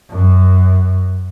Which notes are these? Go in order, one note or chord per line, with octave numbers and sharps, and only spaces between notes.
F#2